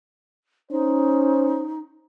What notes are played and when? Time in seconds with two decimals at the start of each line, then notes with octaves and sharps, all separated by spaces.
0.71 C#4 D#4 C5